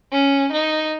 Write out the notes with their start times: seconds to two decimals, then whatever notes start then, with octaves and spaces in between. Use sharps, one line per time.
0.12 C#4
0.52 D#4